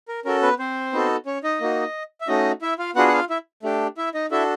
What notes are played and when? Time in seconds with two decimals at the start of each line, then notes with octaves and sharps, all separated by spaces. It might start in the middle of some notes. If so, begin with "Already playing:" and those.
0.08 A#4
0.25 C#4 F#4 A4 A#4
0.42 B3 B4
0.59 C4 C5
0.93 B3 D#4 F#4 A4
1.26 C#4 C#5
1.44 D#4 D#5
1.60 A#3 D#4 F#4
2.21 E5
2.28 A3 C#4 D#4 F#4 D#5
2.62 E4 E5
2.79 F4 F5
2.95 B3 D4 F4 F#4 G#4 F#5
3.08 F#5
3.13 F4 F5
3.30 E4 E5
3.63 A3 D4 G4
3.97 E4 E5
4.14 D#4 D#5
4.31 D4 E4 F#4 A4 E5